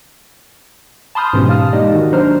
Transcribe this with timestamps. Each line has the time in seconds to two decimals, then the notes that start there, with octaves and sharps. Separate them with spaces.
1.15 A5 B5 C6 D#6 F6 G6
1.33 G#2 B2 E3 G#3 C#4 G4
1.49 F5 A5 D#6 F6
1.73 G#3 A#3 D#4 G4 D5 D#5
1.93 D#3 F#4
2.12 F#3 D4 C5 A#5 F6